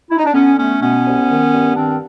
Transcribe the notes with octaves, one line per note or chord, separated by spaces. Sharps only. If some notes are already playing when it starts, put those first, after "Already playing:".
E4
D#4
D4
D3 B3 C#4
A3 B3 C#4
B2 B3 C#4
C2
D#3
G2
D#3 C4 D4